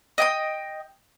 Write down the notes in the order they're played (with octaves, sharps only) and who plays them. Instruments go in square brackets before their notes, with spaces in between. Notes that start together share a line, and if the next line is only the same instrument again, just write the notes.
[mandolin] D#5 G5 D#6